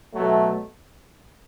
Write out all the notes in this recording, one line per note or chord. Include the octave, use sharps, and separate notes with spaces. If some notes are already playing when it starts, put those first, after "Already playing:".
B2 F#3 A3